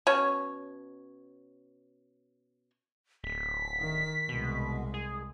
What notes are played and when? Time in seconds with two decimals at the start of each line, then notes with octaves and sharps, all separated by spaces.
0.07 B2 C#4 C#5
3.24 D1 B6
3.79 D#3
4.29 C2 B2 G#3
4.94 G#4